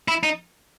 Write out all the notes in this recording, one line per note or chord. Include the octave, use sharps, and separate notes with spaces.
E4
D#4